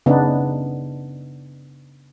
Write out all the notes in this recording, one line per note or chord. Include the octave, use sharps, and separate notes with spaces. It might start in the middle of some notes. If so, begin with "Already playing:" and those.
C#3 B3 D4 D#4